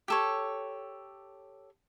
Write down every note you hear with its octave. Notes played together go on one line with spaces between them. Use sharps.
G4 A4 C#5